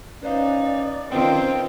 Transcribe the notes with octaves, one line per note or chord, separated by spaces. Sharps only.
C#4 D#4 B4 C5 D5 F5
F2 D#3 C4 C#4 F4 B4 C5 G5